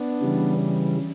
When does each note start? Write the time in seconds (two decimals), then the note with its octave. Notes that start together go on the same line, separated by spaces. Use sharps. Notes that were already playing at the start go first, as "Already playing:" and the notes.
Already playing: B3 D4
0.21 C#3 E3 G3